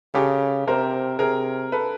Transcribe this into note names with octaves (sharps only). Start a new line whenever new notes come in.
C#3 G4 A4
C3 A#4 C5
C3 G#4 A#4
A4 B4